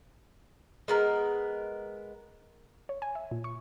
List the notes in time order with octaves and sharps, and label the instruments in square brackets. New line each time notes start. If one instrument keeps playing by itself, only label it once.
[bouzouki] G#3 B3 A#4
[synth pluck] C#5
G#5
E5
A#2
C#6